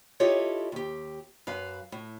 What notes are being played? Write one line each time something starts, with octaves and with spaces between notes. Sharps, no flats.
E4 F4 G4 A4 C#5 D#5
D#2 G4
F#2 B4 F5
A2